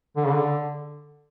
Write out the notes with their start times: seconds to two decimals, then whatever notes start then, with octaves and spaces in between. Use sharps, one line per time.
0.16 D3
0.25 C#3
0.33 D3